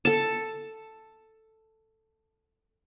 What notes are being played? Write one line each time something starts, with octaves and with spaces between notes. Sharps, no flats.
A4 A5